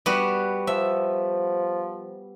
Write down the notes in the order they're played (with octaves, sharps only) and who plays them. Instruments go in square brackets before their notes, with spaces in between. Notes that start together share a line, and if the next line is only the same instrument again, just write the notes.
[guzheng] G3 B3 F#4
[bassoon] F3 [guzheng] E5